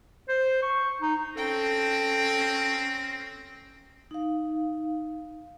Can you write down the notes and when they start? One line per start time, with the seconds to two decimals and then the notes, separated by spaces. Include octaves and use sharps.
0.28 C5
0.62 C#6
1.02 D#4
1.37 C4 C#4 A4 G5 A#6
4.11 D#4 F5